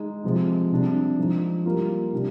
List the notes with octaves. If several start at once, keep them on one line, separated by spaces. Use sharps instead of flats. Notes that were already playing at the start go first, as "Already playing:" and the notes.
Already playing: G#3 D#4
C3 F3 G#3
C3 G3 D4
F3 G#3 D#4
G3 A#3 F4
C3 G3 D4